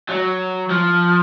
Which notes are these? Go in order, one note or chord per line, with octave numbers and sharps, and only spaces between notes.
F#3
F3